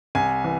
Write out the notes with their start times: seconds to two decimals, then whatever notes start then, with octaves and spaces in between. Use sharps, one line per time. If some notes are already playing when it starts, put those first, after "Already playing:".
0.15 C2 G#5
0.44 E3